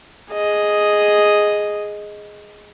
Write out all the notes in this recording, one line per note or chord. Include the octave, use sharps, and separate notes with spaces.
G#4 D#5